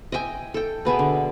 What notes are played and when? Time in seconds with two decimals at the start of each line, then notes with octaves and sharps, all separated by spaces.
0.12 D#5 E5 G5 G#5
0.54 A4 G5
0.85 B2 B3 G#4 E5
0.99 D3